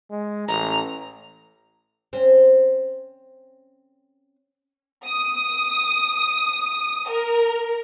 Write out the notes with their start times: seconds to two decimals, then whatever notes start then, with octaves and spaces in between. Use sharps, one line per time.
0.10 G#3
0.48 A1 A#5
2.13 C4 C#4
5.06 D#6
7.08 A#4